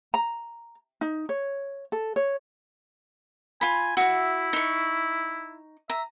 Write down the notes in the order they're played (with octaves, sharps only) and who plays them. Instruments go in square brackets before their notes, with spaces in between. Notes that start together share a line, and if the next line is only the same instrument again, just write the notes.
[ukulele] A#5
D#4
C#5
A4
C#5
[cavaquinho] F4 B5 [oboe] G#5
[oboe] E4 [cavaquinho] F#4 E5
[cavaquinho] D#4 C#6
[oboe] E5 [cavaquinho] A#5